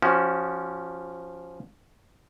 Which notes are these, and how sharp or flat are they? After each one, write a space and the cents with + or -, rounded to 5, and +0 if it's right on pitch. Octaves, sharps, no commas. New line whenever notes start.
F3 +0 C#4 +0 F#4 +30